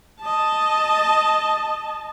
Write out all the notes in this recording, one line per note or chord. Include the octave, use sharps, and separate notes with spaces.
D#5 A5